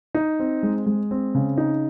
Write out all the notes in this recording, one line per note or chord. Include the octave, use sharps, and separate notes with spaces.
D#4
C4
G#3
G#3
C4
C#3
D#4